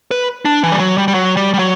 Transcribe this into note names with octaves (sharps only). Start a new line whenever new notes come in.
B4
D4
E3
G3
F#3
G3
G3
F#3
G3
G3
F#3